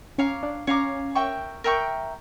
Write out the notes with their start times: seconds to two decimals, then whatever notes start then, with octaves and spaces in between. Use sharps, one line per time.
0.18 C#4 C#5 F5 A#5 D6
0.43 D4
0.67 C#4 C#5 F5 A#5 D6
1.15 A#4 E5 G5 C#6
1.64 A#4 E5 G5 C#6